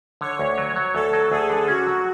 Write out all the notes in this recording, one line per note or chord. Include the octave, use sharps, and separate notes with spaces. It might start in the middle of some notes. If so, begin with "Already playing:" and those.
D3 C#5
D2
F#3
F#3
D2 A4
F#3
D2 G#4
D3
C#4 F#4
F#3